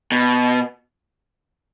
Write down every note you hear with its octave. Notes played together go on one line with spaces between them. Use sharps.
B2